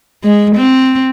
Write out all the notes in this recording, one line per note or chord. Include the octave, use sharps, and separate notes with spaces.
G#3
C4